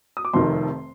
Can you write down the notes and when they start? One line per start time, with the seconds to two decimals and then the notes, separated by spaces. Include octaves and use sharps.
0.17 D#6
0.25 D6
0.33 F1 F2 C3 D#3 C6